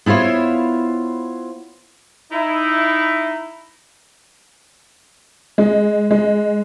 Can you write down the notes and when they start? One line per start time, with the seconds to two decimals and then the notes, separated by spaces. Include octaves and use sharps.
0.06 B3 E4 F4 C5 C#5
2.31 D#4 E4
5.58 G#3
6.11 G#3